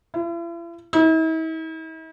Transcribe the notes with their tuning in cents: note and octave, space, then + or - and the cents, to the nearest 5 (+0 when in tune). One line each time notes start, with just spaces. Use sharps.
E4 +45
E4 -45